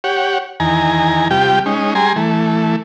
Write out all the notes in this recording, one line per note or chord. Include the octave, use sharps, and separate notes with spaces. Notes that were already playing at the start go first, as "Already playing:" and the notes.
G4 C#5 F#5
E2 D#3 G#5 A#5
C3 G3 F4 G4 G5
G#3 C#4 D#4
G3 G#4 G#5 A#5 C6
E3 A3